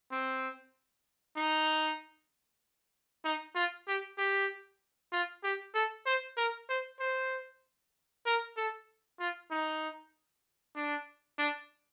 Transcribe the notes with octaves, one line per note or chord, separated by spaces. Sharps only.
C4
D#4
D#4
F4
G4
G4
F4
G4
A4
C5
A#4
C5
C5
A#4
A4
F4
D#4
D4
D4